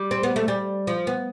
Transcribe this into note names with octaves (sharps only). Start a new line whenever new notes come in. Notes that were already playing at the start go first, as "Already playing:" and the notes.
Already playing: G3
C4
B3
A3
G3
F3
B3